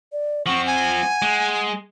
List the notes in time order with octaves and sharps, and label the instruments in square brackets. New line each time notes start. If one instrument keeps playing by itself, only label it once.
[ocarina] D5
[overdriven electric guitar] F3 C4 [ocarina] F#5 [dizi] C#6
[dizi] G#5
[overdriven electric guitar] G#3